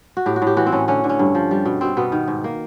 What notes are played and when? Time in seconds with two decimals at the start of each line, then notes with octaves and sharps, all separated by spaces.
0.17 F#4
0.26 A2 G4
0.36 F#4
0.42 A2 G4
0.57 E3 F#4
0.66 C4
0.72 A2 C#4
0.88 D3 C#4
1.04 D3
1.09 C#4
1.19 G2
1.35 F3
1.51 G3
1.66 B2
1.81 B2 C4
1.97 B2 B3
2.12 D#3
2.28 G#2
2.44 A#3